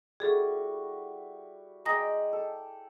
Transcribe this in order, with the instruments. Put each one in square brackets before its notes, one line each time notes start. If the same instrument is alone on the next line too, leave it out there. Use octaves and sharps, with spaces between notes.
[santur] G3 E4 F#4 [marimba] G#4 A4
[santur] G#3 D5 G5 [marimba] A#5 D#6 A#6
[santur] A4